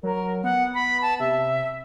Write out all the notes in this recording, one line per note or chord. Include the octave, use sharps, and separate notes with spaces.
F#3 A#4
B3 F#5
B5
A5
C3 E5